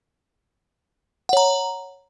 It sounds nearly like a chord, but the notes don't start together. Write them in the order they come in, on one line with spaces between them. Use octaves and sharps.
F#5 C#5 A#5